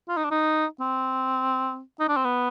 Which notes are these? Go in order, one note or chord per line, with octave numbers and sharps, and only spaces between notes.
F4
D#4
D4
D#4
C4
D#4
D4
C4
B3